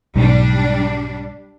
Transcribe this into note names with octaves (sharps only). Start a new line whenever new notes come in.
B1 G#2 G3 D4